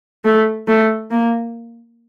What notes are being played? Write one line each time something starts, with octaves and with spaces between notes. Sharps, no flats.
A3
A3
A#3